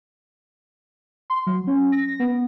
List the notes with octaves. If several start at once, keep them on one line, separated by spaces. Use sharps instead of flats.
C6
F#3
C#4
A#6
B3